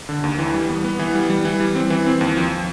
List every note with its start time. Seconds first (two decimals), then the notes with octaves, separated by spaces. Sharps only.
0.09 D3
0.24 D#2
0.39 E3
0.54 G3
0.69 B3
0.84 B3
0.99 E3
1.15 G3
1.30 G3
1.45 E3
1.60 G3
1.75 C4
1.90 E3
2.06 C4
2.21 D#2
2.37 F3